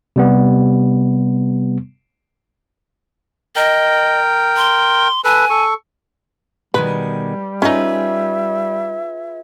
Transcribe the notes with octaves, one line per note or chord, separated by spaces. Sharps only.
C3 G3 B3
A#4 D#5 G5
C6
A4 B4 G#5
A4 C#6
B2 D#3 G3 G#3 B4
C#4 D#4 F4 G#4 B4 E5